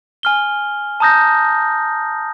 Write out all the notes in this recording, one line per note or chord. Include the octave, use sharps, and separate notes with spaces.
G#5 F6 G7
A5 A#5 D#6 G6 A#6